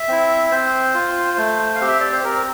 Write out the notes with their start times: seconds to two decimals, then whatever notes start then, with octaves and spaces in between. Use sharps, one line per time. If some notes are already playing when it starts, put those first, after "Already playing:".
Already playing: E5
0.08 C4 E4
0.51 C4 C5
0.94 F4
1.38 A3
1.75 F5
1.81 C4 G4
1.88 E5
2.00 D5
2.12 C5
2.24 C4 A#4